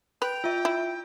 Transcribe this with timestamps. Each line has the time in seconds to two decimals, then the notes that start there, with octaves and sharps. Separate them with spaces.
0.22 B4 G5 F7
0.44 F4 E5
0.65 E4